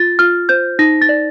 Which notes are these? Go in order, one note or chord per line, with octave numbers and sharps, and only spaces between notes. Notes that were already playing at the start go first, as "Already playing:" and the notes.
Already playing: F4 A6
F4 F6
C5 G6
D#4 A#6
A6
D5